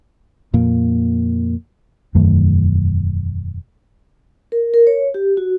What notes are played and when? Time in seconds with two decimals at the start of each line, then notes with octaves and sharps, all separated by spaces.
0.53 F2 A#2 A#3
2.15 E1 F#2 D#3 A3
4.52 A#4
4.74 A#4
4.87 C#5
5.14 G4
5.37 F#4